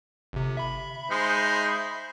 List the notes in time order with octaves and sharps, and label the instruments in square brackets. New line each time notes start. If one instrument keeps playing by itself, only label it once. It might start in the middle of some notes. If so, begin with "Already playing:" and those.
[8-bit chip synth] G1 C3
E5 B5
[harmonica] G#3 D#4 C5